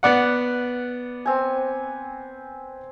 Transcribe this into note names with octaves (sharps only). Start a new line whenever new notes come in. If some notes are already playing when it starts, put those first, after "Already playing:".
B3 D5 F#5
C4 G#5